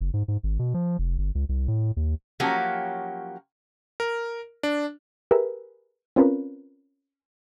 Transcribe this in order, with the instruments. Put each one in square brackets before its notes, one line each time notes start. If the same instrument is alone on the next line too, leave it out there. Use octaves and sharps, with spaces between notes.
[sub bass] F#1
G#2
G#2
G#1
B2
F3
F1
G1
C#2
C2
A2
D#2
[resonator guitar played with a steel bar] F3 F#3 A#3 C#4 F#4 G4
[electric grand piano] A#4
D4
[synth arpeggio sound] G4 G#4 A#4 B4 E5
C4 C#4 F4 A#4 B4